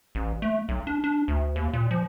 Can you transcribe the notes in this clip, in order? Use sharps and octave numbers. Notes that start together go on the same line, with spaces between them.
A1
A3
B1
D4
D4
D2
D#2
A#2
F3